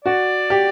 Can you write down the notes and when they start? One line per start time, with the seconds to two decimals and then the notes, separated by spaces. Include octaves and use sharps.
0.05 F#4 D5
0.50 G4